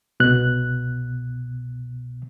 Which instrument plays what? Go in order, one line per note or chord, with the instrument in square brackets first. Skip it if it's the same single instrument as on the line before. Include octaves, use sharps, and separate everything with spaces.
[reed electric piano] C2 B2 F#6